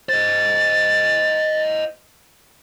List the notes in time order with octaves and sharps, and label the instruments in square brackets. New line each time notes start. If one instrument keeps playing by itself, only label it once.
[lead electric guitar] C5 D#5 [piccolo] A6